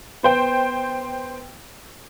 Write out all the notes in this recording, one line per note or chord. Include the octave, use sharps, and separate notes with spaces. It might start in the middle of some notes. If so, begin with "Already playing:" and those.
B3 C5 G5